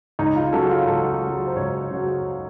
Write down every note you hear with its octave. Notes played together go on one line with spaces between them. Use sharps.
C#2 D#4
F4
C#3 F#3 A4
F4
C#2 A4
F#4
F4
F#4
C#3 F#3
C5
C#2 C#5
C#3 F#3